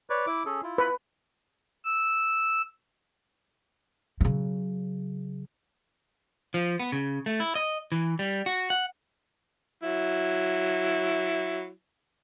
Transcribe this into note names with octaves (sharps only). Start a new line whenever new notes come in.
B4 C#5 D5
E4 D6
C#4 G#4 A4
E4 F4
B4
E6
C#3 F#3
F3
B3
C#3
A3
E4
D#5
E3
G3
F#4
F#5
F#3 E4